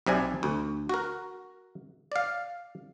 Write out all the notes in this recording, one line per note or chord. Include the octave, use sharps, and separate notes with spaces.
B1 C3 D5 G#5
D2
F#4 A#4
D5 F5